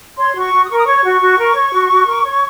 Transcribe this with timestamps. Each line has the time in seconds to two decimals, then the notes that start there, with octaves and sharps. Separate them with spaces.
0.17 C#5 C6
0.35 F#4 C#6
0.52 F#4
0.64 D#6
0.69 A#4 C#6
0.77 D#6
0.86 C#5 C#6
1.03 F#4
1.20 F#4
1.37 A#4
1.55 C#5
1.73 F#4
1.90 F#4
2.06 A#4
2.24 C#5